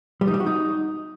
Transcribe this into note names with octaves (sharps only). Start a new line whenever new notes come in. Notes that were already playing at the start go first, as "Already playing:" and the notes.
G3
D#4
G3
F#4
D#4